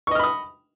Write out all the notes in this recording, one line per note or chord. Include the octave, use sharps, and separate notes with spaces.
D#5 B5 C#6 D#6 F6